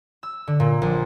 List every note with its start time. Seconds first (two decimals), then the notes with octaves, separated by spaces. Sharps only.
0.23 E6
0.47 D3
0.60 A#2
0.82 A#1